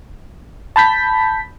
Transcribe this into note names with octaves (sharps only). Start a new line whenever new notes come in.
A5 B5 G6 B6